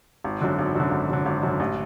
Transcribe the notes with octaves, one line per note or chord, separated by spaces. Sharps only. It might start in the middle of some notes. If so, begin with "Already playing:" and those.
G#1
F#2 D3
G#1
F#2 D3
G#1
F#2 D3
G#1
F#2 D3
A1